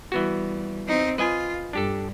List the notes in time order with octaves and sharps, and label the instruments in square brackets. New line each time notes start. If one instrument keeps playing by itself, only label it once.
[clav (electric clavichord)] E3 B3 F#4 [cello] G3
[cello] C4 D#4
[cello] F4 [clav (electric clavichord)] B4 D#5 G#5
[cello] G2 [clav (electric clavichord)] D4 G4 A4